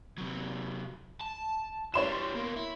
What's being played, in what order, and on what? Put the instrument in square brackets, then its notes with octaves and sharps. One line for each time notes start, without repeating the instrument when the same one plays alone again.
[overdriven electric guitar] C3 F#3
A5
[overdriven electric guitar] E3 G3 [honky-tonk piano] C#5 C6 E7
[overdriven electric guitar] B2 A#3
E4